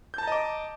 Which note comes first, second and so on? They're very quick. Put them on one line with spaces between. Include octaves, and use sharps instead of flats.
G6 A5 A#5 D#5 D6